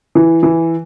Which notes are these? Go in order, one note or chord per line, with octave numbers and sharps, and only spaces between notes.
E3
E3